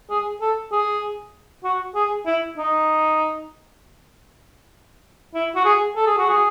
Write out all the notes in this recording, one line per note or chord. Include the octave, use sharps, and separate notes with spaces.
G#4
A4
G#4
F#4
G#4
E4
D#4
E4
F#4
G#4
A4
G#4
F#4
G#4